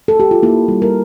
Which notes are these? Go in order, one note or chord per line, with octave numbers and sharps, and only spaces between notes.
A4
G4
F4
A#3 E4
G3
A#4